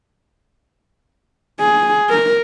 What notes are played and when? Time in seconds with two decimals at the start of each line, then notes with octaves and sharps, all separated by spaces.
1.60 G#4
2.10 A#4